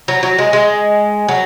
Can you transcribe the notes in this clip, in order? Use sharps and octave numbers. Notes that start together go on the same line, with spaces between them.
F#3
F#3
G#3
G#3
F#3